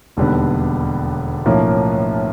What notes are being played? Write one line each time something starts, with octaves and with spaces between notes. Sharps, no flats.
E1 D#2 D3 G3 B3
B1 A2 F3 A#3 C#4